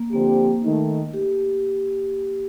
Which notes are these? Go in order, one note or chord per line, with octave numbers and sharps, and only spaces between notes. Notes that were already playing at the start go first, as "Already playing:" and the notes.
Already playing: A#3
D3 F3 A#3 C4 G4
D#3 A3 D#4
G4